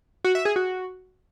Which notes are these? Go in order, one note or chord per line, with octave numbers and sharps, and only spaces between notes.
F#4
E5
G#4
F#4